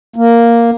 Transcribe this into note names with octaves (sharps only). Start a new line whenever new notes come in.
A#3